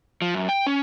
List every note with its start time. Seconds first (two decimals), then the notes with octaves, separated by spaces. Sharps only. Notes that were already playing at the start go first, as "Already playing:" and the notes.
0.22 F3
0.35 F#2
0.49 G5
0.67 C#4